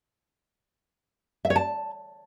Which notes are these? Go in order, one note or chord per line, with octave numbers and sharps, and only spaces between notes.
E5
C#5
A5